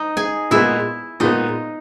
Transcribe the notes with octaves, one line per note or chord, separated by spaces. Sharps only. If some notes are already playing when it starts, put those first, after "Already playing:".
Already playing: D#4 D#5
G#4 G#5
A#2 G#3 B3 E4 E5
A#2 G#3 B3 D#4 D#5